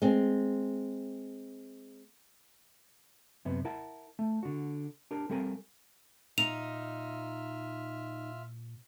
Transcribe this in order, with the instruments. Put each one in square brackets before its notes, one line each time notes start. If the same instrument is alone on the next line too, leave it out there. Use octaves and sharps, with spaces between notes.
[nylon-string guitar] G#3 C4
[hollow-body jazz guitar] F#2 C3 B3
E4 A#4 F#5 A5
A3
D3 F#4
D4 G4 A#4
G3 C4 A4 A#4 G#5
[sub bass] A#2 [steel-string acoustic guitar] D#4 [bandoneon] F4 E5 F6 [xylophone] F7